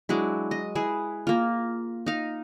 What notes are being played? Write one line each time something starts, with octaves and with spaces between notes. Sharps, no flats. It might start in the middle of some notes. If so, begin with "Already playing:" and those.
F#3 G#3 D4 E4
D#5
E4 G#4 B4
A#3 F4
D#4 F5